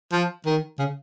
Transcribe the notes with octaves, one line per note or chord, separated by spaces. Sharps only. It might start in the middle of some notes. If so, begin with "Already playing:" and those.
F3
D#3
C#3